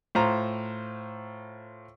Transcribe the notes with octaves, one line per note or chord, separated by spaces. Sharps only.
A2 F4 C5 A#5